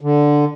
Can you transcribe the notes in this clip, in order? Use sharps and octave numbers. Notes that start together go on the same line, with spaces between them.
D3